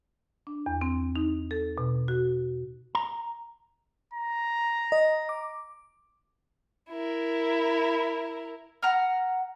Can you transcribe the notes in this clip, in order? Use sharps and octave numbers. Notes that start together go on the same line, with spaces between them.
D4
E2
C4
D#4
A4
B2
F#4
A#5
A#5
D#5
D6
E4 A#4
F#5 A#5 F6